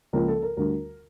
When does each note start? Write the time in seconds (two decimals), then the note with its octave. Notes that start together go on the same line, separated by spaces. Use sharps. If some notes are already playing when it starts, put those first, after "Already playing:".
0.13 C#2 C#3 F3 A#3 A#4
0.28 A4
0.43 A#4
0.57 D2 D3 G3 A#4